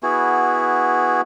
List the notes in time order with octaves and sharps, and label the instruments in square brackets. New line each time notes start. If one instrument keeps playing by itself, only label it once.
[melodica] B3 E4 F#4 G#4